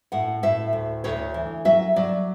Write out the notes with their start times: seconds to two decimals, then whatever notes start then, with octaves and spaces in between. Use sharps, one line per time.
0.12 A2 F#5
0.43 A2 E5
0.73 D2
1.04 D2 C#5
1.34 E3
1.65 F#3 E5
1.96 F#3 D5